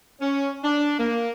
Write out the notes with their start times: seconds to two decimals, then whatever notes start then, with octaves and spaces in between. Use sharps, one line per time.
0.20 C#4
0.64 D4
0.98 A#3